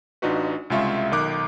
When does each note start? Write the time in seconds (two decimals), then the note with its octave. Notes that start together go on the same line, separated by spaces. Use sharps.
0.22 A1 D4 D#4 F4 F#4 B4
0.70 C2 C#3 G#3 F4 E5 C#6
1.11 B1 D#3 D6 F#6